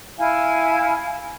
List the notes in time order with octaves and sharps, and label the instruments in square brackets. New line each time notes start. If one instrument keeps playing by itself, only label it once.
[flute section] E4 F5 G#5 G#6